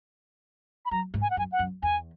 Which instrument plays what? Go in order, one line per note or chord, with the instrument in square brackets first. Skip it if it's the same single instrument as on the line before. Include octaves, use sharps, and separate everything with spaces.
[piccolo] B5
[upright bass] F#3 [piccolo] A#5
[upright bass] G#2
[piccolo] G#5
F#5
[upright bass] F#2 [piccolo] G#5
[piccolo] F#5
[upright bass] F#2
[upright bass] E2 [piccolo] G#5